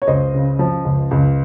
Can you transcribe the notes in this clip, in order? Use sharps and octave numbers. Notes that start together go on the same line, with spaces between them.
C#5
C#2 C5 D#5
C#3
F3
C#2
C#2